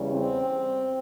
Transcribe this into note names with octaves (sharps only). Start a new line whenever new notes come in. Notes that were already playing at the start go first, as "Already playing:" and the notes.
Already playing: E2 C#3 E3 G3
C4